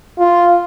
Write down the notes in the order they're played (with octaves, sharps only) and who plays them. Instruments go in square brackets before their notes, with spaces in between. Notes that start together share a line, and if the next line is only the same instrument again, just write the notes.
[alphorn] F4